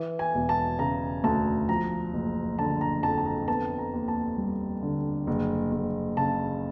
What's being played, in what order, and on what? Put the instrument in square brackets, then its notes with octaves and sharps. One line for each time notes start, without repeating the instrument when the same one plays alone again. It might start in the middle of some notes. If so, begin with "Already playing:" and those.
Already playing: [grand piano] E3
G#5
E1
A5
C#3 A#5
D2 A5
F3 A#5
F#1
D3 A5
A#5
F2 A5
A5
A#5
B3 A5
A#5
D#2
A5
G3
D3
F#1
F#1
C#3 A5